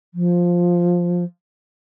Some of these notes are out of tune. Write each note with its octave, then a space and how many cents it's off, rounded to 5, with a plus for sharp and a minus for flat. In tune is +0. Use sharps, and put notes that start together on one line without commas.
F3 +5